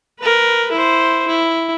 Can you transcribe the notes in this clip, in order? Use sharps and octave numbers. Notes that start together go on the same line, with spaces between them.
A#4 B4
E4 C5
E4